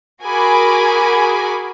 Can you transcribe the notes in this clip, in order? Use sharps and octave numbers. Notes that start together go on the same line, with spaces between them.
F#4 G#4 A#4 G#5 B5 D6